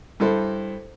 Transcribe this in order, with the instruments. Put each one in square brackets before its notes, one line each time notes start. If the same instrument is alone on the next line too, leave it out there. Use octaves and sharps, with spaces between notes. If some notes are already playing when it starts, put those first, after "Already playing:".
[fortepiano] G2 E4 A4 C5